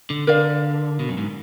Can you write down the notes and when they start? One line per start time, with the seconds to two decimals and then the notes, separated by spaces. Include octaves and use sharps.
0.10 D3
0.27 D3 A#4 D5 F5
1.00 B2
1.09 F#2
1.17 G#2